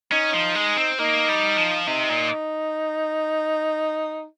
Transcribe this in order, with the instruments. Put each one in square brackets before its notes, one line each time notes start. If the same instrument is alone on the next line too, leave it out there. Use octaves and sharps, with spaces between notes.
[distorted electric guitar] C#4 [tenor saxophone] D#4
[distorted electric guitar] F3
G#3
C4
[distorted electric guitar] A#3 [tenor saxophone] D#4
[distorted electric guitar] G3
F3
[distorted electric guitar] C3 [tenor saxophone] D#4
[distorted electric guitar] A#2